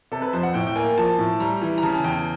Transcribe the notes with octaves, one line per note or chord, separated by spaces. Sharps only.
C3 A4
B4
F2 C5
F#5
A2 G5
G5
A#3 G#5
F3 A5
A2
G3 A#5
E3
A#5
C#3 A5
G#5
E2 G5